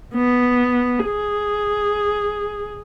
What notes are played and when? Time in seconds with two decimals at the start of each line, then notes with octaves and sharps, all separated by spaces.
0.14 B3
1.05 G#4